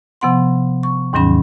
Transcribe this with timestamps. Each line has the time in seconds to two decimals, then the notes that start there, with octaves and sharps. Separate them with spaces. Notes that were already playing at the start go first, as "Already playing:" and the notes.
0.21 C3 F3 B3 F#5 C6
0.83 C#6
1.13 D#2 G#2 D#3 F#3 C#4 B5